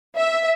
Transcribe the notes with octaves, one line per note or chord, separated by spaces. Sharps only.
E5